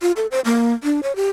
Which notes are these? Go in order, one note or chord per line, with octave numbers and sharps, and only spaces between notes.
F4
A4
C5
A#3
D4
C#5
G4